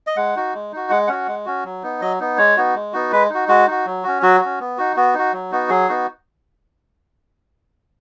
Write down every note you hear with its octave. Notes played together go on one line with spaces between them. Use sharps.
D#5
G#3 F#5
D#4 F#4
G#3
D#4 F#4
G#3 F#5
C#4 F#4 F#5
G#3
C#4 F#4
F#3
B3 D#4
F#3 D#5
B3 D#4
G#3 C#5
B3 D#4 F#4
G#3
B3 D#4 F#4
G#3 B4
D#4 F#4
G#3 F#4
D#4 F#4
F#3
C#4 F#4
F#3 F#4
C#4 F#4
B3
D#4 F#4
B3 F#4
D#4 F#4
F#3
B3 D#4 F#4
F#3 G#4
B3 D#4 F#4